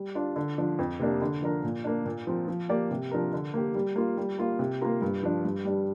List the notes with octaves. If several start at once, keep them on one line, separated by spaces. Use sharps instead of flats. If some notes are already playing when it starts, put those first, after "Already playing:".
Already playing: G3
D4 F4 D5
D3
F3 D4
F2
C3 A#3 D4
D3
F3 D4 A#4
A#2
A#3 D4
A#2
F3 C4 A#4
F3
A#3 G4 D5
C3
F3 D4 A#4
D3
A#3 G4
G3
A#3 F4
G3
A#3 F4
C3
A#3 F4 A#4
G2
F3 D4
G2
G3 D4